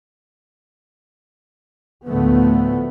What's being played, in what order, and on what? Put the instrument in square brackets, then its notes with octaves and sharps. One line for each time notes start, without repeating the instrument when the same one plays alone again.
[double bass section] D2 A2 D3 F3 A3 B3